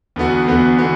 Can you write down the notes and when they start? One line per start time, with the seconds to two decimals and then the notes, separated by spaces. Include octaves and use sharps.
0.16 E2 D3 B3 F#4
0.47 E2 D3 B3 F#4
0.78 D3 B3 F#4